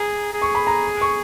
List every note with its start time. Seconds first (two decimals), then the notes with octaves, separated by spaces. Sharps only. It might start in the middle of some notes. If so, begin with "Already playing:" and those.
Already playing: G#4 A#5
0.33 G#4
0.42 C#6
0.55 B5
0.67 A#5
1.01 C#6